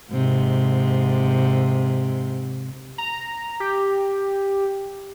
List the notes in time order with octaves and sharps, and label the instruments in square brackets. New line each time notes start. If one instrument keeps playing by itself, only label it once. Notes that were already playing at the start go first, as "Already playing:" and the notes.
[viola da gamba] G#2 C3
[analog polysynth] A#5
G4